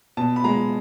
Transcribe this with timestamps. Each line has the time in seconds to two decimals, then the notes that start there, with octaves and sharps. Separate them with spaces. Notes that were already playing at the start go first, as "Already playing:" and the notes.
0.17 B2 A5
0.36 B5
0.44 G#3 A#5